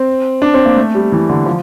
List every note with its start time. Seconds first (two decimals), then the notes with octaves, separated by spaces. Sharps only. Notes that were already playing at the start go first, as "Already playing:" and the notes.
Already playing: C4
0.42 D4
0.54 C4
0.66 A#3
0.76 A3
0.95 G3
1.12 E3
1.29 D3
1.46 F3